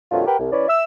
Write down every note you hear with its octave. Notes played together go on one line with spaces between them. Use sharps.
G2 C3 D#3 F#3 A3 F4
G4 A#4 B4 F#5 G5
C2
E3 C#4 B4 C#5 D5
E5 E6